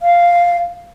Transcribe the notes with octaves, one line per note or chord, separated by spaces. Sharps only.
F5